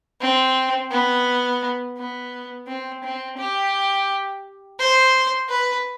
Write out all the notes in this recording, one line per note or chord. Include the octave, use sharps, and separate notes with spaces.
C4
B3
B3
C4
C4
G4
C5
B4